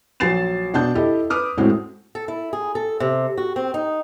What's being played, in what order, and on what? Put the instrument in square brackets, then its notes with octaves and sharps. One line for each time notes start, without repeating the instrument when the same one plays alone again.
[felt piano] A#1 F#3 G#5 A6 C7 E7
B2 D4 F#5 A5 G6
E4 G4 A4 D#5
B4 D6 D#6 F6
A2 G#3 A3 C4 F#4
[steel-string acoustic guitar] A4
E4
G#4
A4
C3
F#4
C4
D#4